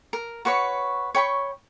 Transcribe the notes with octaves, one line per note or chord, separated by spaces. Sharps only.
A#4
F#4 B4 C#5 C#6
C#5 G5 B5 C#6